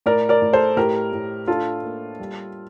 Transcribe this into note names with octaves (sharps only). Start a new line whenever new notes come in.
A2 A#4 D5
A#4 D5
A2
A4 C5
A2 G4 A#4
A2
D4 F4 A4
A#3
G3